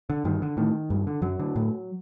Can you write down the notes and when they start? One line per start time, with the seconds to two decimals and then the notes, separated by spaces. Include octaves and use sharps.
0.10 D3
0.24 G2 D#3
0.42 D3
0.57 A2 D#3
0.90 G2
1.07 D3
1.22 F#2 F#3
1.39 D3
1.56 A2